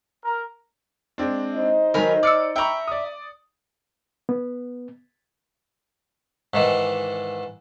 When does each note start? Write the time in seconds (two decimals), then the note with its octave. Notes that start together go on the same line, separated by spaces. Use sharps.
0.25 A#4
1.18 G#3 C4 D4
1.54 D#4 C5 D#5
1.94 D#3 F#3 A#4 G#5 B5
2.23 D5 D6 E6 F6 C#7
2.56 E5 G5 A#5 B5 C#6
2.87 D5 D#6
4.29 B3
6.54 G#2 D#3 E3